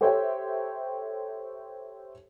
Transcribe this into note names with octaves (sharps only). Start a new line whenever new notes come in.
G4 A4 C5 C#5 E5 G5